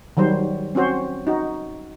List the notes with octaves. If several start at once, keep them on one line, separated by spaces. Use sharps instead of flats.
D#3 F#3 G3 C5
C4 C#4 F#4 C5
D#4 F#4